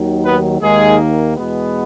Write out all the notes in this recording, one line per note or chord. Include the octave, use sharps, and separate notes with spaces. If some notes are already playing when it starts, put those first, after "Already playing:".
Already playing: D#2 D#3 F#3
B3 B4
D#2 D#3 G#3 A#3 G#4
E2 B2 G#3 B3